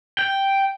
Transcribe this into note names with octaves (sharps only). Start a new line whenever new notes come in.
G5